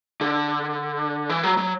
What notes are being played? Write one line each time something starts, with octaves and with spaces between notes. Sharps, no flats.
D3
E3
F#3
F#3